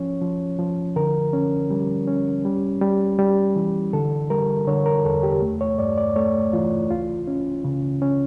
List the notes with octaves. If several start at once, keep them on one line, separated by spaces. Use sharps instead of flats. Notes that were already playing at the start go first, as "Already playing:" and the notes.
Already playing: F3 C#4 C#5
F3
F3
D3 A#4
C#4
G3
C#4
G3
G3
G3
E3
D3 A4
G3 A#4
D3 C#5
A#4
E2 A4
G4
A3
C#5
G2 D5
D5
A3 C#5
E3 F4
C#2 F4
C#4
C#3
C#4